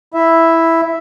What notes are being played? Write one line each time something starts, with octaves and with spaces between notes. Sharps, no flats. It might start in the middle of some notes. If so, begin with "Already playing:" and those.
E4 E5